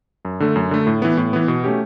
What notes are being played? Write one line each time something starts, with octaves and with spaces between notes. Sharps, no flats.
F#2
D3 A3
F#2
D3 A3
A2
E3 B3
A2
E3 B3
B2
A3 C#4 G4